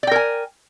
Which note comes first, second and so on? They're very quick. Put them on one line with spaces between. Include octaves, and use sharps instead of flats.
D5 G5 A#4 G#5